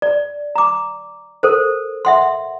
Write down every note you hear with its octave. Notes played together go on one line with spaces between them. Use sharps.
D5
A#5 D6
A4 A#4 C5
E5 F#5 C6